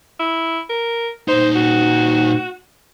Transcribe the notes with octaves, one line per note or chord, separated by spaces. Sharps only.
E4
A#4
A#2 D#4 C5
F#4